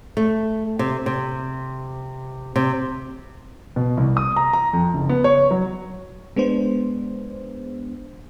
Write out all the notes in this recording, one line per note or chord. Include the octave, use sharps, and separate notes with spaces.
A3
C3
C3
C3
B2
C2
D#6
A#5
A#5
F2
F#1
B3
C#5
F#3
G#3 B3 D4 C5